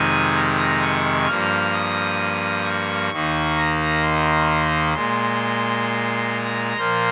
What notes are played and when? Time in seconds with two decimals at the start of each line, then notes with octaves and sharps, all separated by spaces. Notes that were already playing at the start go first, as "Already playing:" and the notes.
Already playing: F2 C3 D#3 G#3 G#5
0.36 A#5
0.82 C#6
1.27 G2 F3 A#3 F6
1.73 D#6
2.65 C#6
3.11 D#2 D#3 A#3
3.57 A#5
4.02 C6
4.94 A#2 G#3 C6
6.31 A#5
6.77 A#2 F3 A#3 C6